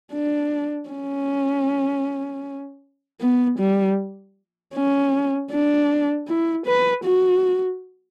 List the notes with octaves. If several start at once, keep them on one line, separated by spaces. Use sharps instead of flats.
D4
C#4
B3
G3
C#4
D4
E4
B4
F#4